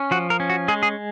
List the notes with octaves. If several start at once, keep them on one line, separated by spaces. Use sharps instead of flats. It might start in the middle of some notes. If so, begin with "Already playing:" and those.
Already playing: C#4
F3 F#4
A#4
C#4
F#4
G#3 G#4
G#4